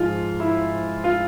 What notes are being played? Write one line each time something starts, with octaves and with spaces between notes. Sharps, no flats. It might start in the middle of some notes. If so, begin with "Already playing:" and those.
Already playing: G#2 F3 G#3 F4
E4
F4